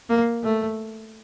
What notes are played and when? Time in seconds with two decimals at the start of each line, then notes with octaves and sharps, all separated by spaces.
0.09 A#3
0.43 A3